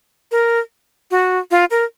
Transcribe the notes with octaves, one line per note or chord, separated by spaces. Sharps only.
A#4
F#4
F4
A#4